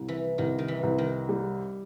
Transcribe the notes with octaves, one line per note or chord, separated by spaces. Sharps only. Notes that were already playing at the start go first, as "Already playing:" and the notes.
Already playing: C2
E3
C2 D#3
D#3
E3
C2
D#3
G3